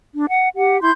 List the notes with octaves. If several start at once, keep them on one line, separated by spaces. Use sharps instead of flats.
D4
F#5
G4 F#5
E4 C6 G6